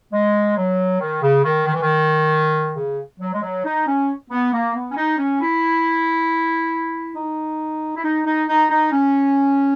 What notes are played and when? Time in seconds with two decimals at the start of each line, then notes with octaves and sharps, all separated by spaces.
0.13 G#3
0.57 F#3
1.00 D#3
1.22 C#3
1.44 D#3
1.66 D#3
1.74 E3
1.82 D#3
2.76 C#3
3.20 F#3
3.34 G#3
3.42 F#3
3.65 D#4
3.87 C#4
4.30 B3
4.53 A#3
4.75 B3
4.91 C#4
4.96 D#4
5.18 C#4
5.41 E4
7.16 D#4
7.96 E4
8.04 D#4
8.25 D#4
8.48 D#4
8.70 D#4
8.92 C#4